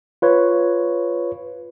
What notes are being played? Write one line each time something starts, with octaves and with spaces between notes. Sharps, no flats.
F4 B4 C#5